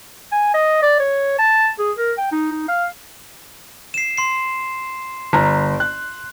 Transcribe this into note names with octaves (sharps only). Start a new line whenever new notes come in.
G#5
D#5
D5
C#5
A5
G#4
A#4
G5
D#4
D#4
F5
C7 E7
C6 C7
G1 A#5
F#6